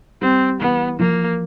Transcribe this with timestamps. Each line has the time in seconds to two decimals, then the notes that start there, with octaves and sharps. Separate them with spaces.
0.21 G3 C4
0.61 E3 B3
0.99 F3 A#3